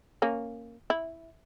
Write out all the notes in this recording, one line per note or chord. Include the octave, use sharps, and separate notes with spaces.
A#3 C#4
E4